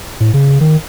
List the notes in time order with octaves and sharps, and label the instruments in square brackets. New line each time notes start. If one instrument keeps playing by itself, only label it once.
[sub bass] A2
C#3
D#3